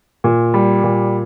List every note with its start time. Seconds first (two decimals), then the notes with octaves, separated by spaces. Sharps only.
0.24 A#2
0.54 G3
0.83 A#2